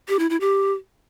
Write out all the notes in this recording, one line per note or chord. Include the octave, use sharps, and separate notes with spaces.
G4
E4
E4
G4